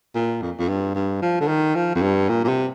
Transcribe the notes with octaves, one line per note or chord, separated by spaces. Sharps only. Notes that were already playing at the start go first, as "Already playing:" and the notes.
A#2
F2
F2
G2
G2
F3
D3
D#3
F3
F2
G2
A#2
A#2
C3